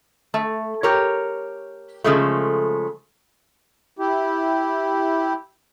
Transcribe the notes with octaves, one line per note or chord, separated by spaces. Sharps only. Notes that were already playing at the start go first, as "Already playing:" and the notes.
A3
G4 A#4 C#5
C#3 F3 G#3 A3
E4 G4